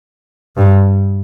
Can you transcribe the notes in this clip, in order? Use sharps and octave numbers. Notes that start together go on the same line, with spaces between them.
G2